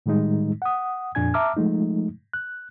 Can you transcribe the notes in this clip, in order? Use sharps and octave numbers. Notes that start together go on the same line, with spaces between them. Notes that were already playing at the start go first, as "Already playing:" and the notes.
A2 D#3 G3 G#3 D#4
F#5 D#6
F2 A#2 D4 G#5 G#6
E5 A5 A#5 D6 E6 F6
F3 G#3 A3 D#4
F#6